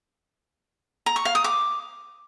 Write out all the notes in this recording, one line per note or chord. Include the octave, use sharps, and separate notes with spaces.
A#5
C#6
F5
D#6
D6